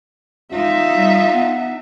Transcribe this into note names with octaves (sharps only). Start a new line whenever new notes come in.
G#3 D#4 F4 E5
G3
B3